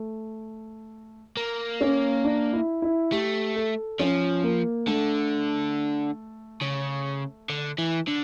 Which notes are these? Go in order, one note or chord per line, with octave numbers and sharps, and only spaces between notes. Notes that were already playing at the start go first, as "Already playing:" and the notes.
Already playing: A3
A#3
C#4
D4
E4
E4
A3 G4
A4
F3 C#4
A#3
D3 A3
C#3
D3
E3
D3